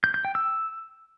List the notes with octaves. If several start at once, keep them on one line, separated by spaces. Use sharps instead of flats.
G6
G6
G5
E6